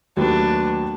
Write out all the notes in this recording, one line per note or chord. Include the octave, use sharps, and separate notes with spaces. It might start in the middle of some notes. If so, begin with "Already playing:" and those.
D#2 F#3 A3 D4 B4